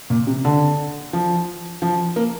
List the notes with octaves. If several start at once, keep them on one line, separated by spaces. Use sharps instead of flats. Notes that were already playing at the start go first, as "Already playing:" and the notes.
A#2
C3
D3
F3
F3
A#3